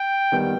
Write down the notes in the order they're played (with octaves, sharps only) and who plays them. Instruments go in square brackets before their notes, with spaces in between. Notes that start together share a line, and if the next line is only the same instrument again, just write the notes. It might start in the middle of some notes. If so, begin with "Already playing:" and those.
Already playing: [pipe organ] G5
[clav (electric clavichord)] D#3 G3 B3